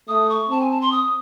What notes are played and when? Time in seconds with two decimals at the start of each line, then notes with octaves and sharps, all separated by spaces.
0.08 A3 D#6
0.30 C#6
0.49 C4 A5
0.61 G#5
0.70 A5
0.81 C6
0.92 D#6